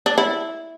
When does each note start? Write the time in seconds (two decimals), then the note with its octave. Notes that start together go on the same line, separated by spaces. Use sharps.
0.06 D4
0.18 E4